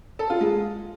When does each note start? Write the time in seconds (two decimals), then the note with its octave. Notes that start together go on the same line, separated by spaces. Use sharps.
0.19 A4
0.30 F4
0.41 G#3